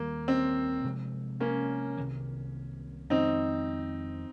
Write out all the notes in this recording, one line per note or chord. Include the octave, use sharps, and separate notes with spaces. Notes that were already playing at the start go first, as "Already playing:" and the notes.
Already playing: D#2 D#3 G3 A#3
C4
C3 F3 G#3 C4
A#3 C#4
C2 C3 D#3 A#3
F2 D#3 G#3 C4 D#4